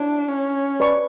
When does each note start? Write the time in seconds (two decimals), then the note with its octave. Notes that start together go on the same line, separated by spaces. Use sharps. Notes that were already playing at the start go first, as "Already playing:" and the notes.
Already playing: D4 E4 C#5
0.27 C#4
0.80 B4 D5 A5 C#6